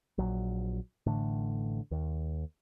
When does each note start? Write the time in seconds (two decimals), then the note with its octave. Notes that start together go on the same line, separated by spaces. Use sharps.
0.18 A#1 F#3
1.06 A1 A2 D3
1.91 D#2